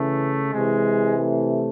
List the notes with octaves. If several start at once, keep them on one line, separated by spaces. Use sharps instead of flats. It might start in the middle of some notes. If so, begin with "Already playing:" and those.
Already playing: C#3 E3 A3
C3 E3 G#3
A3